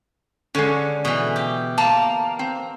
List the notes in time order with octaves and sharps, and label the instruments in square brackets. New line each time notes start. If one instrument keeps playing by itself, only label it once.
[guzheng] D3 [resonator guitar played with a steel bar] G#3 C#4
[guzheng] B2 E3
G4
[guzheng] A#3 [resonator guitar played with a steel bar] A5
[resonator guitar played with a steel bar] C4